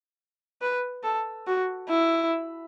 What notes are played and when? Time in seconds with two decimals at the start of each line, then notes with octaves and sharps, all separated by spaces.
0.62 B4
1.03 A4
1.47 F#4
1.88 E4